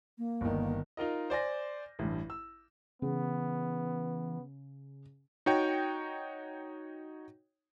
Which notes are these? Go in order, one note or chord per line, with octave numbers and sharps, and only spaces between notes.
A#3
G1 D#3
D#4 F4 A#4 D#5
C5 D5 G#5 A#6
A1 G2
E6
C#3 E3 B3
D#4 F#4 C#5 G5